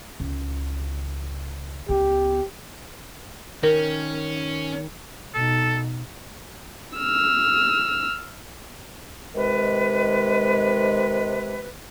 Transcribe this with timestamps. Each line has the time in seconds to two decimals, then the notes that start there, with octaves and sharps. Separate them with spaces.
0.20 C#2
1.89 C#2 B3 G4
3.63 D#3 C#4 A#4
5.34 B2 D#4 A4
6.97 E6 F6
9.34 C3 D#3 G#3 B4